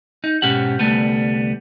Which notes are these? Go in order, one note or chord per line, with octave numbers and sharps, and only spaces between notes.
D#4
G#2 B2 C#4 G4 F#5
C2 D3 F#3 G3 A3 B3